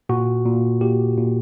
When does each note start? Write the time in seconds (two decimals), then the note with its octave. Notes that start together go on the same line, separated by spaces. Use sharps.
0.09 A#2 F#4
0.45 A#2
0.81 A#2 G4
1.17 A#2